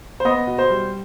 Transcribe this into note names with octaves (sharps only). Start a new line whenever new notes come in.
C5
B3 D#5
B2
C5
G3